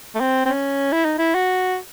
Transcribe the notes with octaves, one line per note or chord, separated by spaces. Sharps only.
A3
C4
C4
C#4
E4
D#4
E4
F#4